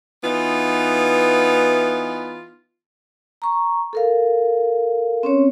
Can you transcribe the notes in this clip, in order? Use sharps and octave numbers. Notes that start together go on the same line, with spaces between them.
E3 B3 D#4 F4
A#5 C#6
A4 A#4 F5
C4 C#4 C#5